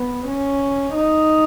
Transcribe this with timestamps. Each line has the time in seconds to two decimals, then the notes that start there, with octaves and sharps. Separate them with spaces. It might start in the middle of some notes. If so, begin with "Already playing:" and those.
Already playing: B3
0.28 C#4
0.94 D#4